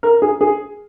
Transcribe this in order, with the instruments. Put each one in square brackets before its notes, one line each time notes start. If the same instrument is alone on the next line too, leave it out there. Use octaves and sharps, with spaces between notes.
[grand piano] A#4
G#4
G#4